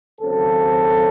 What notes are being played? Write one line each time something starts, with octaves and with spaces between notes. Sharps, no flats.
D#2 C#3 F#3 C4 A4